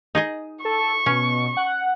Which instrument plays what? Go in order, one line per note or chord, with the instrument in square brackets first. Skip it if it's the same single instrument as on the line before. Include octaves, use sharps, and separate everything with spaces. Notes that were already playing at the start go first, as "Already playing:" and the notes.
[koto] D#4 G#4 D#5
[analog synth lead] A4 [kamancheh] C#6
[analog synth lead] B2 [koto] C#4
[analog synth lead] F#5